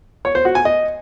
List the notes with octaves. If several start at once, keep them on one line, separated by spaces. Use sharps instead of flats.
C#5
C5
F#4
G#5
D#5